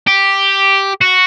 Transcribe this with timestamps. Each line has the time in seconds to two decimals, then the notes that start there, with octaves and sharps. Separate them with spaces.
0.07 G4
1.01 F#4